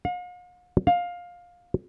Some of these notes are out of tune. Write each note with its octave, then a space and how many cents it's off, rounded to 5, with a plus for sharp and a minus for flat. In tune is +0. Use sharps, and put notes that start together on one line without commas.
F5 +45
F5 +15